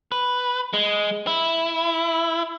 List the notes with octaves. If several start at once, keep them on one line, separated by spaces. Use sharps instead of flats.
B4
G#3
E4